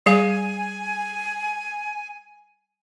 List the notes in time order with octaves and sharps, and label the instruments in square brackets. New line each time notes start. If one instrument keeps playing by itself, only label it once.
[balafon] G3 G#4 F5 [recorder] G#5